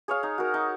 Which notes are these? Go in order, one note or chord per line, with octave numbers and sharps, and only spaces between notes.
G#4 C#5 F5
D#4
F#4 A#4
D#4